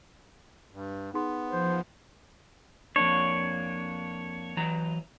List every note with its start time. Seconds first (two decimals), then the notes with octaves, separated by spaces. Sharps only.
0.73 G2
1.14 B3 D#4 G#4 C6
1.51 F3 C5
2.96 F2 A#3 D4 C#5
4.57 E3 F#3 A#5